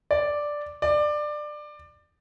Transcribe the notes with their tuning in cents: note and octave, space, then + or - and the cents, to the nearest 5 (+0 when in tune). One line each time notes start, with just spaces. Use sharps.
D5 +0
D5 +20